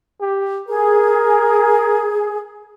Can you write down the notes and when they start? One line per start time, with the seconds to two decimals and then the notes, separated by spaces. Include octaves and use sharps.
0.21 G4
0.68 G#4 A#4